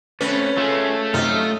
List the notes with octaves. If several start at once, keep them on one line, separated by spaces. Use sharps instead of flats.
A3 C4 C#4 B4
A3 F4 G#4
F#2 C3 D#4 F4 F5